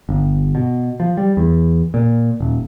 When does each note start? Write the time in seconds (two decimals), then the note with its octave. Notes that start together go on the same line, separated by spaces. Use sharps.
0.09 G1
0.55 B2
1.00 F3
1.17 G3
1.37 E2
1.94 A#2
2.40 D#1